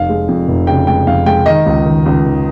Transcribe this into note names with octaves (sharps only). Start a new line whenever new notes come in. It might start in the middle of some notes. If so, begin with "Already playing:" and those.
Already playing: F1 F5
G#3
F2
F1
C#3 G5
G#3 G5
F2 F5
G#3 G5
D#3 D#5
C#2
D#3
C#2
D#3